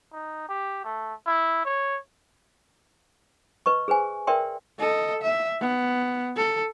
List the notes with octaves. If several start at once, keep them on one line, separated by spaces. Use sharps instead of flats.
D#4
G4
A3
E4
C#5
B4 D#5 C#6
G#4 B4 C5 G#5
A#4 B4 D5 E5 G5 C6
A4 D#5
E5
B3
A4